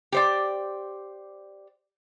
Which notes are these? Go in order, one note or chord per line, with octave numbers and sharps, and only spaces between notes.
G4 C5 D5